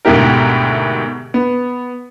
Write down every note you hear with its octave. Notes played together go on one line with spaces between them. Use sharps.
D2 G#2 B2 E4 G4 A#4
B3